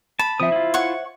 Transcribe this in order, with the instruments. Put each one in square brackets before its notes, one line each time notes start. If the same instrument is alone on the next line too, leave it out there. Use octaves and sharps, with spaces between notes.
[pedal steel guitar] A5 [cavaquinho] B5
[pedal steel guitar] F3 C4 D#6 [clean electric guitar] C5 E5
[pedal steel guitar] E4 F4
[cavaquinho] C#5 F#5 C#6